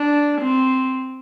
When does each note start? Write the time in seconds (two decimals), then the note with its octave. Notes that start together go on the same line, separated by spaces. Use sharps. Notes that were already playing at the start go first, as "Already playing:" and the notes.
Already playing: D4
0.41 C4